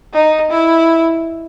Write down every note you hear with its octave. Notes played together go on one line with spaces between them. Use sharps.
D#4
E4